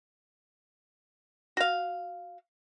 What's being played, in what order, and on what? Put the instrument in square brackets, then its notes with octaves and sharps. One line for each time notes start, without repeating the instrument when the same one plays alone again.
[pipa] F#4 F5